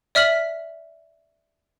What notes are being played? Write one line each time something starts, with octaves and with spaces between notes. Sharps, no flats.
D5 E5 F6 B6 F#7